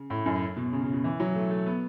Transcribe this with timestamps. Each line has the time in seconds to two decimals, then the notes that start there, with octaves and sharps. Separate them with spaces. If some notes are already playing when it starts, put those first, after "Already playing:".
Already playing: C#3
0.10 A2
0.26 F#2
0.57 B2
0.73 C#3
0.83 C#3
0.93 B2
1.04 E3
1.20 F#3
1.35 A3
1.51 A3
1.66 B3